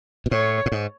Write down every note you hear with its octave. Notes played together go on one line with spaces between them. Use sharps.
B2
A2 C#5
A2
G#2